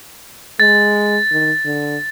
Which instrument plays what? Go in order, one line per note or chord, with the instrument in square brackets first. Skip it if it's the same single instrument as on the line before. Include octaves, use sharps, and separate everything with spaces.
[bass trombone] G#3 [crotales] A6
[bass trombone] D#3
D3